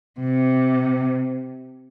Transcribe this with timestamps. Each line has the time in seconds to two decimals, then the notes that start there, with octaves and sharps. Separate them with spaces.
0.20 C3